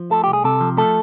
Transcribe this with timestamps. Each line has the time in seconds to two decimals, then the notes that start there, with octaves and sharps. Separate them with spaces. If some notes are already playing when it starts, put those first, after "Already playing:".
Already playing: F3
0.10 A3 A4
0.24 C2 G4
0.33 G#4
0.44 C3 A4
0.60 F3
0.77 A3 A4